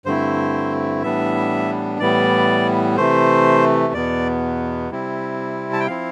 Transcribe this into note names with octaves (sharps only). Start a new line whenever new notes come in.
G2 D3 A3 C4 E4 C5
A2 E3 G3 B3 D4 E5
A2 E3 G3 B3 D5
C3 E3 A3 C5
E2 B2 B3 D5
C3 G3 C4 E4
A5
G5
F3 C4 E4 F5